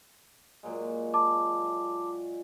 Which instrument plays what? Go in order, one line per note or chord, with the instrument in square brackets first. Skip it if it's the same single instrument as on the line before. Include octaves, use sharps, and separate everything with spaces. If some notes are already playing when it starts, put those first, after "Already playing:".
[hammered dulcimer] A#2 F#3 G#3
[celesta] A5 D6